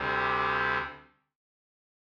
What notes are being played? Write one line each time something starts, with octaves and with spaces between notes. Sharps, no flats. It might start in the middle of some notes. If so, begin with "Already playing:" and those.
Already playing: D2 C3 G3